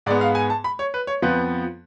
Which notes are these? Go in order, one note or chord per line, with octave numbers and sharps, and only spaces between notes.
G#2 G#3 B3 D5
F5
G#5
A5
B5
C#5
B4
C#5
F2 F3 B3 B4